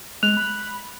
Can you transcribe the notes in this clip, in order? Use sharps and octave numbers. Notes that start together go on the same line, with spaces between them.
G#3 F#6 F7
B5